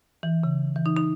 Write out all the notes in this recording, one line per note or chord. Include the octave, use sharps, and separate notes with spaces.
E3
C#3
E3
D#4
D#4